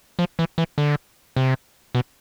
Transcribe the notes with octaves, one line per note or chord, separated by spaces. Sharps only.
F3
E3
E3
D3
C3
B2